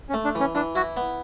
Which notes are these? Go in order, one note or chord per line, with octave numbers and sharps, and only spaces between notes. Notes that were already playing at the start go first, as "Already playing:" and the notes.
C#4
A3
D4
E3
C#4
E3 D4
E4 F#4
B3